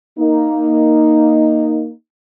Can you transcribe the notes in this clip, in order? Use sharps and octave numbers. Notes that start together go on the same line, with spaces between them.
A#3 D#4